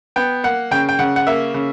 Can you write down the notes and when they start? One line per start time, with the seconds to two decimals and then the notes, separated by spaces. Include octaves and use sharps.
0.16 B3 G5
0.44 A#3 F#5
0.71 C#3 G5
0.89 G5
0.99 C#3 F#5
1.16 F#5
1.27 A#3 E5
1.54 C#3